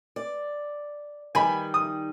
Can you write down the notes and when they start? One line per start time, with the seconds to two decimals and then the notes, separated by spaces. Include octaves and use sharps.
0.16 D5
1.35 D#3 G3 G#5 B5
1.74 D#6